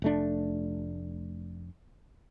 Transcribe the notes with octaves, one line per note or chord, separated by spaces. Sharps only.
F1 A3 D4